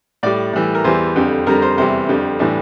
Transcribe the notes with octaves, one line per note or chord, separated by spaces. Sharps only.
A2 G3 D5
A2 E3 G3
A#4
E2 E3 G3 C5
F2 D3 G3
F2 D3 G3 A#4
C5
E2 C3 G3 C5
F2 D3 G3
A2 E3 G3 D4